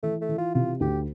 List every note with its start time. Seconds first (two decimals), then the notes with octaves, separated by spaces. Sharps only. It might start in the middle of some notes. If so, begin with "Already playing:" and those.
0.03 E3 A3
0.21 A3
0.29 E3
0.38 F4
0.54 C3 F4
0.80 D2 G4